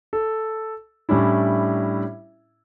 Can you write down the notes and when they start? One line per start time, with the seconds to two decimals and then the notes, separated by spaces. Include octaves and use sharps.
0.13 A4
1.09 A2 G3 C#4 D4 E4